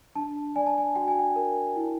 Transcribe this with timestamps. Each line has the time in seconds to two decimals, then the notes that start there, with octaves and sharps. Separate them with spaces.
0.15 D4 A5
0.56 D5 G#5
0.66 A5
0.78 G#5
0.95 F#4 G5
1.08 G#5
1.19 G5
1.36 A#4
1.76 E4